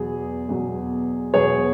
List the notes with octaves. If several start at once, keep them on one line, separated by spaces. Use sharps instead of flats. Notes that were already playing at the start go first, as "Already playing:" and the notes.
Already playing: E2 B2 F#3 G#4
E2 B2 F#3
E2 B2 F#3 G#4 C#5